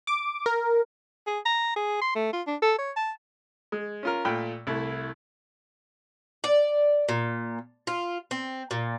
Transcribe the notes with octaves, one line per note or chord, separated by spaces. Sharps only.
D6
A#4
G#4
A#5
G#4
C6
A3
F4
D4
A4
C#5
A5
G#3
C#4 F4 A#4
A#2 A3 F4 G5 B5
C2 A3 E4
D5
A#2
F4
C4
A#2